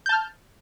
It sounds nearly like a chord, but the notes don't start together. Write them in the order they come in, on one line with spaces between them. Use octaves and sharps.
G6 A5 F6